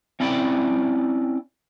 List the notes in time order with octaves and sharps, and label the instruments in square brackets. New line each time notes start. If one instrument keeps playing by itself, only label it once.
[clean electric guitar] C4 C#4 E4 D5 G5 B5